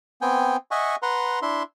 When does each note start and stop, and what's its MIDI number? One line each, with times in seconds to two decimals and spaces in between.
0.21 0.57 59
0.21 0.57 60
0.21 0.57 79
0.21 0.57 80
0.71 0.96 75
0.71 0.96 76
0.71 0.96 78
0.71 0.96 80
0.71 0.96 85
1.02 1.39 71
1.02 1.39 78
1.02 1.39 82
1.02 1.39 84
1.42 1.63 62
1.42 1.63 64
1.42 1.63 76
1.42 1.63 84